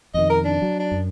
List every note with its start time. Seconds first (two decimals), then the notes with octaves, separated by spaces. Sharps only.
0.14 F2 B2 D#3 D#5
0.30 A#4
0.45 D4
0.62 F#3
0.80 D4
0.91 F#2